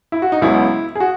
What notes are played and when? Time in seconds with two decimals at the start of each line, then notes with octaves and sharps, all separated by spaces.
0.12 E4
0.22 F#4
0.32 D#4
0.41 C#2 C#3 F#3 B3 E4
0.95 G#4
1.00 F#4